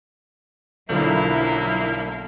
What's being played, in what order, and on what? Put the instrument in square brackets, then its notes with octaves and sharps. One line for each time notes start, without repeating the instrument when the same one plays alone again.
[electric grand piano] B1 D3 F3 [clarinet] F#3 [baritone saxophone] A#3 [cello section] E4